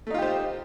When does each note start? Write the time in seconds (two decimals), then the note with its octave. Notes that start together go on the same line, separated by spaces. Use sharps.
0.07 A3
0.11 D#4
0.14 F4
0.18 G4
0.22 C5